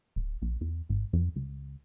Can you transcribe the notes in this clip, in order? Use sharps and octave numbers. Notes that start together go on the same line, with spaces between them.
D1
A#1
E2
G#1
F2
C#2